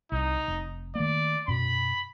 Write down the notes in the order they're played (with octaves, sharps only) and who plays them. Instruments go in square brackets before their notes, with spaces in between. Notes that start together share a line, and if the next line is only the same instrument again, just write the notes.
[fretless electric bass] C2 [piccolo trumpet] D#4
[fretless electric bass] F1
[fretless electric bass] D#3 A3 A#3 [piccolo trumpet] D5
[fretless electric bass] F#2 B2 [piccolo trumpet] B5